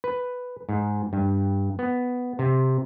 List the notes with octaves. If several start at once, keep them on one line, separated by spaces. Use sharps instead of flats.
B4
G#2
G2
B3
C3